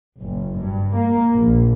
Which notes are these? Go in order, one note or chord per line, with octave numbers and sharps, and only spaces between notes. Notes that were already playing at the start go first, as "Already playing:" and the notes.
F#1
G2
A#3
A#1